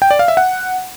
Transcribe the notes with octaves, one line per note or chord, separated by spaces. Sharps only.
G5
D5
F5
E5
F#5